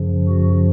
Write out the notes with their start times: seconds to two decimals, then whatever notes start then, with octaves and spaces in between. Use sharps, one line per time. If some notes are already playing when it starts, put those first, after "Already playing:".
Already playing: F#2 C#3 F3
0.29 F#4